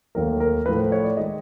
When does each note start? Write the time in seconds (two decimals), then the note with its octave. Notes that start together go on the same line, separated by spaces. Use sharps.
0.15 D#2 D#3 F#3 A3 A#4
0.40 A#4
0.65 A2 F3 A3 B4
0.79 C5
0.92 C#5
1.05 D5
1.17 D#3 G#3 D#5